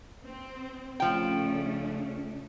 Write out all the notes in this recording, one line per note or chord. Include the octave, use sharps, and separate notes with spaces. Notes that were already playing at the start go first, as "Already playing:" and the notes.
C4
C#3 F3 A3 D4 G5